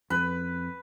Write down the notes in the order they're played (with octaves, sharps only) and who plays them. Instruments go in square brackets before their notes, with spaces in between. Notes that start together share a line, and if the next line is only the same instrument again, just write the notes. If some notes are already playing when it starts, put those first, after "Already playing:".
[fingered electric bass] F2 [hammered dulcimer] B4